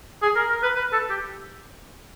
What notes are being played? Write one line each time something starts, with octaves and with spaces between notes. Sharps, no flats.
G#4
A#4
A#4
B4
B4
A4
G4